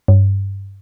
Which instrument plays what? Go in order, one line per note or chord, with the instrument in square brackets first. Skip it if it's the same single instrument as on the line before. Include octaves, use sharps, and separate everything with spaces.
[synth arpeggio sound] G2